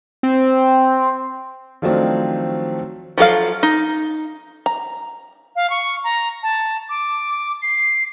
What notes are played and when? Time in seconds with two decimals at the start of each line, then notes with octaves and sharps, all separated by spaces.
0.23 C4
1.82 D#3 F3 F#3 A3 C4 D4
3.18 F3 F#3 A4 F5
3.63 D#4
4.66 A#5
5.56 F5
5.70 C#6
6.04 A#5
6.43 A5
6.89 D6
7.62 C7